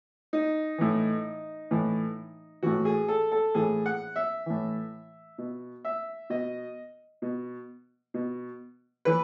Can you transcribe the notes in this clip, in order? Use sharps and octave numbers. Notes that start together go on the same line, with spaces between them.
D#4
A2 E3
A2 E3
A2 E3 F#4
G#4
A4
A4
A2 E3 G#4
F#5
E5
A2 E3
B2
E5
B2 D#5
B2
B2
E3 B4